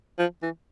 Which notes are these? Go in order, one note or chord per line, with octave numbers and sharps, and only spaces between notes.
F3
E3